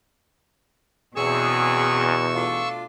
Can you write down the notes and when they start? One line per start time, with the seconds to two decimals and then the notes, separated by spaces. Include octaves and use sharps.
1.16 E2 B2 C4 C#4 G#4 C#6 E6
2.36 A3 D4 F4